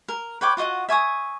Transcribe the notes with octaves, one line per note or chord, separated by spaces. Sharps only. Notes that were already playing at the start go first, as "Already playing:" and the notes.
A#4
B4 C#5 G5 D6
F4 F#4 D#5 F#5
E5 G#5 C#6 D#6